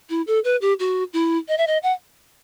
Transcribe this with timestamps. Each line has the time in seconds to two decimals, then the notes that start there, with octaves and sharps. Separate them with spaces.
0.09 E4
0.27 A4
0.44 B4
0.61 G4
0.79 F#4
1.13 E4
1.48 D#5
1.58 E5
1.67 D#5
1.83 F#5